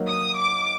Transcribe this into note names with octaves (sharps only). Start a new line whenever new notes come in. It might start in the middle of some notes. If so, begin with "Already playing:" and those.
Already playing: F#3 A#3 D#4
D#6
D6